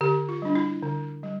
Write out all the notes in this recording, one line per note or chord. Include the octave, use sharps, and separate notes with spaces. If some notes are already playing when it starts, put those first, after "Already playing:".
D3 G4
F4
G3 D4
E4
D3
G3